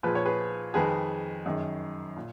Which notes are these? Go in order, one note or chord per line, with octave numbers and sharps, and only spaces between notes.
A#2 F3 G#3 B4
C#5
G#4 B4
F2 D#3 G#3 G#4 B4
F#2 D#3 G#3
A#2